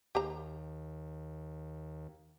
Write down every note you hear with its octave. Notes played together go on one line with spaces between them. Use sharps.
D#2 G4 C5 A#5